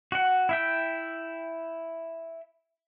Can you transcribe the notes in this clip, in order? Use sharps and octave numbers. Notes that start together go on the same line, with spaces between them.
F#4 F#5
E4 E5 G5